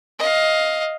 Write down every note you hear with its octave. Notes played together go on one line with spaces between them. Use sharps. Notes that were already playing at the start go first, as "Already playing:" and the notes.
D#5 F5